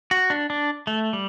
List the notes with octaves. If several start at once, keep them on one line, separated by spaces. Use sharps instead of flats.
F#4
D4
D4
A3
G3